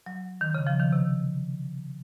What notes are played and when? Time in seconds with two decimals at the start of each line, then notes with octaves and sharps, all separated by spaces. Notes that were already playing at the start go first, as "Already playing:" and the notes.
0.06 F#3
0.41 D#3
0.55 C#3
0.67 F3
0.80 D#3
0.92 C3